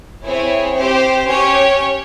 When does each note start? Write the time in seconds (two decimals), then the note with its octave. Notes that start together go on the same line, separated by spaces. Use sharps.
0.25 C4 E4 G#4 C#5
0.76 C4 G4 C5
1.27 C#4 G4 C#5